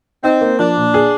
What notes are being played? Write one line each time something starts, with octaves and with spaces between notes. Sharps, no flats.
C4 D#4
A#3
F3 D4
A#2
G#4